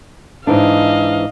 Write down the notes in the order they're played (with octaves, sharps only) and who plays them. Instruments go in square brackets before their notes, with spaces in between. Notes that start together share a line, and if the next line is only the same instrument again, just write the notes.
[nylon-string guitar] G#2 E3 D4 [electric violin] D#5 F5